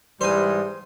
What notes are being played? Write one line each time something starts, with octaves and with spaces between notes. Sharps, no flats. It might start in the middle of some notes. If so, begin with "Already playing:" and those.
G#2 E3 G3 C5 G#5